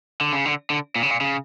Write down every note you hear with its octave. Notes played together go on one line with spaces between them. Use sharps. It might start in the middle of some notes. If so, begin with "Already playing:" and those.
D3
C#3
D3
D3
A#2
C#3
A#2
C#3